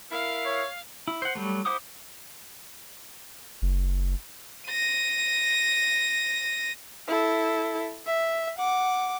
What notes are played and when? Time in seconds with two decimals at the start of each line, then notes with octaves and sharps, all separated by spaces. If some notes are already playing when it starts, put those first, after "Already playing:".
0.11 E4 A#4 F5
0.46 C#5
1.08 E4
1.22 C5 F#5
1.35 F#3 G3 A3
1.65 E4 C5 F#5 D6 D#6
3.62 F#1
4.67 A#6 D#7
7.08 E4 A4
8.06 E5
8.58 F#5 D6